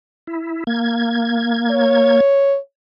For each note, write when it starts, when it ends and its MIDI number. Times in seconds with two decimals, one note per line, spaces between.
0.27 0.64 64
0.67 2.20 58
0.67 2.20 92
1.71 2.57 73